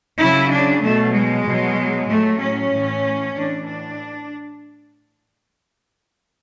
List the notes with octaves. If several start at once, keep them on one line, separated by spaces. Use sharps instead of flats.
C#3 F#3 E4
D4
B2 F#3 A3
G#3
B2 F#3
A2 F#3 A3
C#4
A2 E3
A2 E3 D4
D4